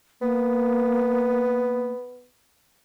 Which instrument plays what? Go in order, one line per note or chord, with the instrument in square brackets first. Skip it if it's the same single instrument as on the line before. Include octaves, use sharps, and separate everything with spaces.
[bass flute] A#3 [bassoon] B3